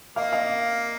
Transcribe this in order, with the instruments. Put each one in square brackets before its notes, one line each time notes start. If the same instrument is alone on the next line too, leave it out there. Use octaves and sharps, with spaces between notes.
[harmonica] A#3 [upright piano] D#5 F5
[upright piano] D#5 F5